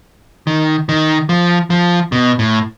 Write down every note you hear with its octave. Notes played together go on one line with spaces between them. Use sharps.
D#3
D#3
F3
F3
B2
A2